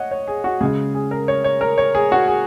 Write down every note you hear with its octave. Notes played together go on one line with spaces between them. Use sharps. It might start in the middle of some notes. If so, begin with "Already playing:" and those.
Already playing: C#5 D#5 F#5
C#5
G#4
F#4
C#3 G#3 G#4
G#4
A#4
C#5
C#5
A#4
C#5
G#4
F#4
G#4